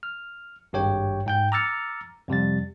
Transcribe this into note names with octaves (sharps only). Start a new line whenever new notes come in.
F6
G#1 G2 G4 C#5 G5
G#2 G5 G6
A#5 D6 E6 F6 A6 C#7
F2 C3 G3 A6